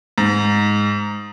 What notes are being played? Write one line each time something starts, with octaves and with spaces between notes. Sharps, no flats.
G#2